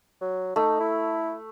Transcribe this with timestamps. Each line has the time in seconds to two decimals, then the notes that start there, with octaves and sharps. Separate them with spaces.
0.21 F#3
0.56 A3 D#4
0.80 E4